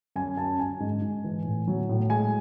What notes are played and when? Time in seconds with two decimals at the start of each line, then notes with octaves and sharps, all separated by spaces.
0.16 F#2 G#5
0.37 F#2 A5
0.59 F#2 G#5
0.80 G#2
1.02 G#2
1.24 E3
1.45 A2
1.67 F#3
1.89 A2
2.10 G#3 G#5